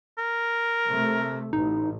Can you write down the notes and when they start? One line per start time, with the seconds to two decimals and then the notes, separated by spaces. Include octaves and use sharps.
0.18 A#4
0.88 C3 A3
1.53 A1 D#4